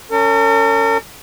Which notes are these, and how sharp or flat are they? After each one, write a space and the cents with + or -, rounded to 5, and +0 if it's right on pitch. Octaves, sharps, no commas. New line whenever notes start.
C#4 +15 A#4 -45